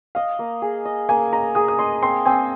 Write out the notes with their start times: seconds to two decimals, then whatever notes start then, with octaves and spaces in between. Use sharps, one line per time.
0.15 D#5 F5
0.39 A#3
0.62 G#4
0.85 D#5
1.09 A#3 G#5
1.32 D#5 A#5
1.55 G#4 D#6
1.68 D#6
1.79 D#5 C6
2.02 C4 C6
2.25 C4 G#5